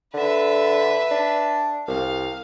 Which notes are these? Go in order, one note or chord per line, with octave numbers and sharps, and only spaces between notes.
D3 B4 E5
D4
C2 F5